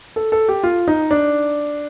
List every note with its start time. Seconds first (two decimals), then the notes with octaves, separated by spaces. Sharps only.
0.16 A4
0.32 A4
0.49 G4
0.64 F4
0.88 D#4
1.11 D4